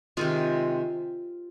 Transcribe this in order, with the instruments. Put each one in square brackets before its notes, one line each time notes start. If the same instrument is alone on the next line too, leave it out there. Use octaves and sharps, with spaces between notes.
[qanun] C3 D#3 G#3 F4 G#4